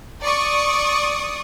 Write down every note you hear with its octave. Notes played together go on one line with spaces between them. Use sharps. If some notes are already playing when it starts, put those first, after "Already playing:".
D5 C#6 D#6